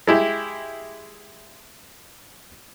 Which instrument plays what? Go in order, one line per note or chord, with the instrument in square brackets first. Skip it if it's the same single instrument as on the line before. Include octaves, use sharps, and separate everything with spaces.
[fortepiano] G#3 E4 G4